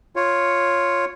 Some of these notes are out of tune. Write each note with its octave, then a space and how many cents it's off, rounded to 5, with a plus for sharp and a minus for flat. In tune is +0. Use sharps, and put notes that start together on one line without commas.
F4 +0 C#5 -5